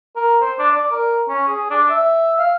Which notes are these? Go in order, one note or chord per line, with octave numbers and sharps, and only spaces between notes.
A#4
C5
D4
D5
A#4
C#4
G#4
D4
E5
F5